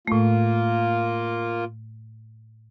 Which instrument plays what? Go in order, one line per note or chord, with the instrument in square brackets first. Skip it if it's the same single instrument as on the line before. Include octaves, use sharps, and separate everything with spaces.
[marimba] A2 A3 [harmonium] A#3 F4